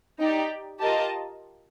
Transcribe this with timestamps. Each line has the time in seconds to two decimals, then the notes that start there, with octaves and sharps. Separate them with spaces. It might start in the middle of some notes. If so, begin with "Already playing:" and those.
0.19 D#4 G4 D5 G5
0.80 F4 G4 A#4 D#5 A5